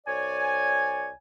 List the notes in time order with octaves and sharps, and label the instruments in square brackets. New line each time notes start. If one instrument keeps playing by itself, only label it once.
[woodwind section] C2 C#5 D5 G#5